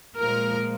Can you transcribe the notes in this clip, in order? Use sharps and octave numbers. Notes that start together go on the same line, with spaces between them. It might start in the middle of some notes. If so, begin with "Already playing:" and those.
A#2 F3 G#3 A#4